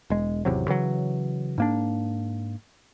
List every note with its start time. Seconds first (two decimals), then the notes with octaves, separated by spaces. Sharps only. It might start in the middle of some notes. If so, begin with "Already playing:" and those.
0.10 E1 G#3
0.45 G#1 E2 C3 F#3
0.68 C#3 E3 F#3
1.58 G#2 A#3 D4